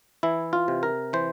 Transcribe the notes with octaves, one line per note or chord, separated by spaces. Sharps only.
E3 E4
F4
C3
A#4
E3 C5